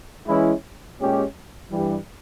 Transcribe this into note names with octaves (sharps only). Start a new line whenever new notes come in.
E3 G#3 C#4 E4
A#2 G#3 C#4 G4
G2 E3 G3